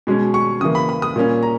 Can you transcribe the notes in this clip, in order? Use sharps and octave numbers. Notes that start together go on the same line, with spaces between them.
B2 G#3 C#4
C#6
C#3 E3 A#3 D#6
B5
B5
D#6
A#2 A#3 C#4
A#5